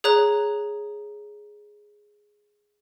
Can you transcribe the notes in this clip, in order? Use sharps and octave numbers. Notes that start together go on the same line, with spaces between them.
G#4 C#5 A#5 F#6 F7